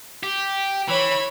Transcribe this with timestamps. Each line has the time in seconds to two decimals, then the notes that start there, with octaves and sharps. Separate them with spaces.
0.23 G4
0.88 E3 C#5 B5